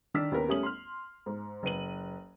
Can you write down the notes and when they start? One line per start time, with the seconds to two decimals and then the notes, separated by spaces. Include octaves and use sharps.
0.14 D#3 D4 E6 F6 B6
0.32 D#2 B3 C#4 A#4 F6
0.48 G3 A3 C#4 D#6 F#7
0.63 C6 F6
1.26 G#2
1.63 F#1 B4 D#7 F#7